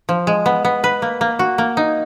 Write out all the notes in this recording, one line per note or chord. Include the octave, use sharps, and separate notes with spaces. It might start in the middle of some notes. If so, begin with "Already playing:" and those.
F3
G#3
B3
B3
B4
A#3
A#3
F#4
A#3
D#4